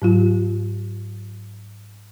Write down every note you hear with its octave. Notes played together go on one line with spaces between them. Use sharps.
G#2 F#3 F4